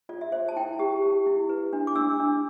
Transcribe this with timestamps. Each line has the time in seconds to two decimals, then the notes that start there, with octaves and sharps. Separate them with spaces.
0.09 F4 D5
0.21 E5
0.32 C5 E5
0.48 A5
0.56 E4 G5
0.79 G4
1.02 G4
1.26 E4
1.49 B4
1.73 D4
1.87 D6
1.96 D4 E6
2.20 D4